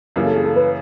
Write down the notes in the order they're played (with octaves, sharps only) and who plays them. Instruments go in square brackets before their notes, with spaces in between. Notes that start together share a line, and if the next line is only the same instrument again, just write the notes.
[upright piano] F#2 C#3 E3 G3 A#3 [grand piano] A#4
[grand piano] A4
G#4
A4
B4